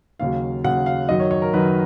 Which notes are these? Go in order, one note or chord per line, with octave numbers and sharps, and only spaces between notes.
D#2 C#3 F#3 F5
D#2 C#3 F#3 F#5
F5
F#2 D#3 F#3 D#5
C#5
C#5
A#4
F#2 D#3 F#3 B4